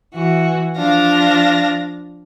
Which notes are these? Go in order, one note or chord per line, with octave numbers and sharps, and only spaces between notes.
E3 F#4
F3 D4 F5 A#6